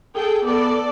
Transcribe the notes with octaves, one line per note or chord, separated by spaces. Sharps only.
G#4 A4 G5
B3 A4 D5